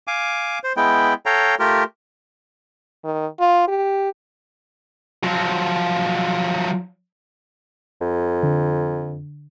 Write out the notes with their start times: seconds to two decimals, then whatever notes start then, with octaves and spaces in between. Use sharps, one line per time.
0.07 F5 G#5 D6
0.64 C5
0.77 G#3 B3 E4 G5
1.26 A4 C#5 F5 G5 A#5
1.59 A3 F4 G4 A#4
3.04 D#3
3.39 F4
3.68 G4
5.23 F3 F#3
8.01 F2
8.43 D3